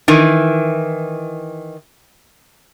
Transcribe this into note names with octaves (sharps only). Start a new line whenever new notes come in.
D#3 E3